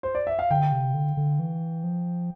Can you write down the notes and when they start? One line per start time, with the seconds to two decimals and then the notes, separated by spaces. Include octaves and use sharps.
0.03 C5
0.15 D5
0.27 E5
0.39 F5
0.50 D3 G5
0.72 C3
0.94 D3
1.17 D3
1.39 E3
1.84 F3